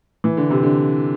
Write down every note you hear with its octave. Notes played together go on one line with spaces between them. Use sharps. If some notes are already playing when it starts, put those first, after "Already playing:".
E3
D3
C3
D3